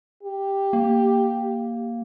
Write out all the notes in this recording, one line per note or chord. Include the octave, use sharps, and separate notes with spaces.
G4
A#3